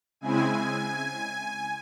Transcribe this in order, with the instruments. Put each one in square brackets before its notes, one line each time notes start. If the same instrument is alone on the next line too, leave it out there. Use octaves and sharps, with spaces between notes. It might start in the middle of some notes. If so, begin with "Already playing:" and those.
[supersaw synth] C#3 G#3 C4 E4 G#5